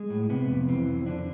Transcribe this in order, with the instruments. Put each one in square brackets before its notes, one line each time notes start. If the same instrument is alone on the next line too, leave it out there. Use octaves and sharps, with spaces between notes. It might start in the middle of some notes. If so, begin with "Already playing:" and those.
Already playing: [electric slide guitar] G#3
A2
C3 B3
F2
E3 C4
F2
D3 D4